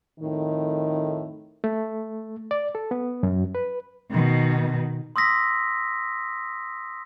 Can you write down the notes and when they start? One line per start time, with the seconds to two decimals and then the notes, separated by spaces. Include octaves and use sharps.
0.19 F2 A2 D#3
1.64 A3
2.51 D5
2.75 A4
2.91 B3
3.23 F#2
3.55 B4
4.11 B2 D#3
5.16 C6 D#6 E6 A#6 B6